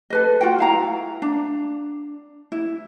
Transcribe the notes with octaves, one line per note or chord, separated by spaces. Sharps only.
A4 B4 D#5
F4 F#4 F#5 G5
E4 F5 A#5
D4
E4